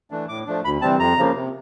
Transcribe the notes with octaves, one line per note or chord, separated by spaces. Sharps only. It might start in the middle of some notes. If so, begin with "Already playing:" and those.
E3 A3 D4
A2 D6
F3 A3 D4
D2 B5
C3 E3 G3 C4 A5
F2 A#5
C#3 F3 A#3
C3